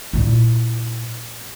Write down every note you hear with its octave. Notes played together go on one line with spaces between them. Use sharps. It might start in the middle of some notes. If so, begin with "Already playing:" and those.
A#2 E4